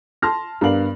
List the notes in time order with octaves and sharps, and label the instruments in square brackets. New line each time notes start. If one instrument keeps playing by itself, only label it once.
[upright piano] A5 C6 F6 A#6
G2 B3 A#4 D5 F5 F#7